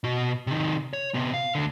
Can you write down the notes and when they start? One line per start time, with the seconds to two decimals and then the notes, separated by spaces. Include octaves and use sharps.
0.04 B2 F#4
0.47 C3 D#3
0.93 C#5
1.14 C3 B3
1.34 F5
1.55 D2 D3